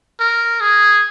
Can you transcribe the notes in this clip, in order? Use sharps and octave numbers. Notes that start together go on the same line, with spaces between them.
A#4
G#4